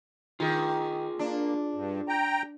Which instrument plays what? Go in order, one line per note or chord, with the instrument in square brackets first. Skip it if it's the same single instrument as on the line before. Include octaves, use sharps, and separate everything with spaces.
[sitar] D#3 [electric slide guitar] F4 G#4
[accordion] A#3 [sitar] D4
[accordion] G2
G5 A#5